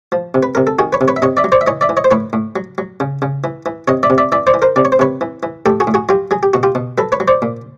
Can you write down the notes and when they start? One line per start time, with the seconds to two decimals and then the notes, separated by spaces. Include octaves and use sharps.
0.12 F3
0.34 C3
0.43 B4
0.55 C3 A#4
0.67 A4
0.79 D#3 F#4 G#4
0.93 B4 C#5
1.01 C3
1.08 B4 C#5
1.16 E5
1.22 C3 C#5 D#5
1.37 D5 E5
1.44 F#3
1.52 C5 D5
1.61 E5
1.67 E3 C#5 D#5
1.81 D5 E5
1.89 E3
1.97 C#5 D#5
2.04 C5
2.11 A2 B4 C#5
2.33 A2
2.56 F#3
2.78 F#3
3.00 C#3
3.22 C#3
3.44 E3
3.66 E3
3.88 C3 C#5 D#5
4.03 D5 E5
4.10 C3
4.18 D5 E5
4.32 E3 D5 E5
4.47 C5 D5
4.54 E3
4.62 A#4 C5
4.76 C3 D5
4.85 C#5
4.92 C5
4.99 C3 B4 C#5
5.21 E3
5.43 E3
5.66 A2 G4 A4
5.80 F#4 G#4
5.87 A2
5.94 F#4 G#4
6.09 F#3 F4 G4
6.31 F#3 G#4
6.43 G4
6.54 B2 F#4
6.63 F4 G4
6.75 B2
6.98 F#3 A4 B4
7.12 B4 C#5
7.20 F#3
7.28 C5 D5
7.42 A#2